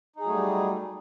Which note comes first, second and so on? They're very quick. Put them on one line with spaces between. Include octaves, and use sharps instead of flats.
D#4 G#4 F#3 A3 G3